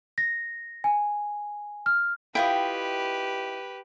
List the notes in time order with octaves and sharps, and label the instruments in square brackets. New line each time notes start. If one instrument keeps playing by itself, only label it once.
[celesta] A#6
G#5
F6
[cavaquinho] E4 F4 D#5 [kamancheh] G4 B4 [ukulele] G5